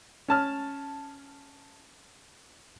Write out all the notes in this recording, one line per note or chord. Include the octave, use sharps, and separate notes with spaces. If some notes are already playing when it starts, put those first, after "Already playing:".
C#4 A5 F6